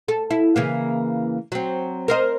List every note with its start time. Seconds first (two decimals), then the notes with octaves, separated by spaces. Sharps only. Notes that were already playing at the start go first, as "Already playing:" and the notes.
0.08 A4
0.30 E4
0.56 C#3 E3 A#3
1.52 F#3 C4
2.08 A#4 C5 D#5